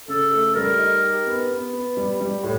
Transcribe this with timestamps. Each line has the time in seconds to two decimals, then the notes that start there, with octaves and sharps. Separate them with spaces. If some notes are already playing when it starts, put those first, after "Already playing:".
0.08 C#3 A4
0.32 A3
0.55 G3 A#4
0.78 D#4
1.02 G4
1.27 B3
1.50 B3
1.73 B3
1.97 G3
2.20 G3
2.43 A2